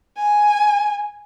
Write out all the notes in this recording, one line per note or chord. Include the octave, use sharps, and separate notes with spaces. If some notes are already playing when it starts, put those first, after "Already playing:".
G#5